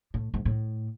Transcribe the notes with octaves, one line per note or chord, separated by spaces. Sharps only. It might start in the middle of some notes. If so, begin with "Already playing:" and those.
A2
G#2
A2